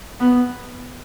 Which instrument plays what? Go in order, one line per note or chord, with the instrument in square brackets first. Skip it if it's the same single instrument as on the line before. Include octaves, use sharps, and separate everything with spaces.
[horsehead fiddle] B3